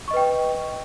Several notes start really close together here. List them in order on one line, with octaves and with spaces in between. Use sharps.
C#6 D#5 B4 G5